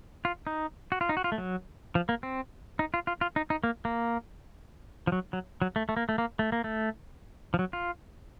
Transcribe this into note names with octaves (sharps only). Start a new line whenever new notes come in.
F4
D#4
F#4
F4
D#4
F#4
F4
A3
F#3
F3
A#3
C4
D#4
F4
F4
F4
D#4
D#4
A#3
A#3
F3
F#3
F#3
F#3
A3
A3
A#3
A3
A#3
A3
A#3
A3
F3
F#3
F4